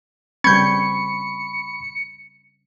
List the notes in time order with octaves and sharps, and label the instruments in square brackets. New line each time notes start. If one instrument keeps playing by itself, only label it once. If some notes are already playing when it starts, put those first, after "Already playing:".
[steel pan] C#3 G3 C4 [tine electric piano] B5 C#6 [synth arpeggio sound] G6 G#6 [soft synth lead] C#7